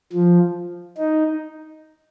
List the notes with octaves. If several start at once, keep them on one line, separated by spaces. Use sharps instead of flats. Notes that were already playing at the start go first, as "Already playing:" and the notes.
F3
D#4